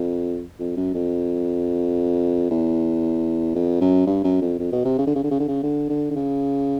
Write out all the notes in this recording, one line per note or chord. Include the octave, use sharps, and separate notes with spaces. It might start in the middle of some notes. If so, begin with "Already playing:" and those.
Already playing: F2
F2
F#2
F2
E2
F2
F#2
G2
F#2
F2
F2
B2
C3
C#3
D3
C#3
D3
C#3
D3
C#3
D3
D3
D3
C#3